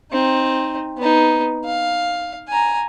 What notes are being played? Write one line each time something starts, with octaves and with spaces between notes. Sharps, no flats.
C4 D#4
B3 D#4
F5
G#5 A#5